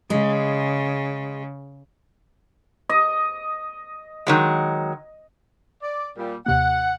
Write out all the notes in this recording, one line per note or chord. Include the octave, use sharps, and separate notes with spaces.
C#3 G#3
D#5
D#3 F#3 G#3
D5
A#2 G3
D#2 C3 A#3 F#5